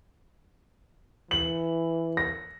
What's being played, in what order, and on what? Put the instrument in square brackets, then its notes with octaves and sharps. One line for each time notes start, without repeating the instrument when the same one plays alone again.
[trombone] E3 [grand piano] F#7
[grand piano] A#6